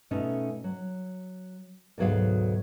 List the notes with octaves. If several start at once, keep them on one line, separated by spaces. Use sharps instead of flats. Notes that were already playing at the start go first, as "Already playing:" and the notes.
B2 A3 C#4 D#4
F#3
D2 G#2 B2 F#3 G#4 F5